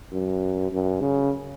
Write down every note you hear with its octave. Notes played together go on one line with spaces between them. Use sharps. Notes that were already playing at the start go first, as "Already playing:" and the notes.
F#2
F#2
C#3